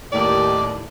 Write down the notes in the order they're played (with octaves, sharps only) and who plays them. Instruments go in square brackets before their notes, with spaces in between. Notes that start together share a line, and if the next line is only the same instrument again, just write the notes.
[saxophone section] D#2 A2 [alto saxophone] D5